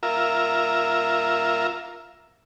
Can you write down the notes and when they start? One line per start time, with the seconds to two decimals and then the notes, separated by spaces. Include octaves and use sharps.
0.03 F4 A#4 E5